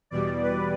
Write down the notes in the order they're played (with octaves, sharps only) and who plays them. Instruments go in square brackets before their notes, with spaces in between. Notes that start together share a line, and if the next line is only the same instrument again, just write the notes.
[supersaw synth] E2 B2 G3 D5
B4